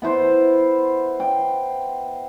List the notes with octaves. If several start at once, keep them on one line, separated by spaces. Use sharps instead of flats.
B3 E4 C5
G5